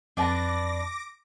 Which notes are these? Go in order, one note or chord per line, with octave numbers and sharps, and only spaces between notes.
F2 D4 B4 A5 D6 A#6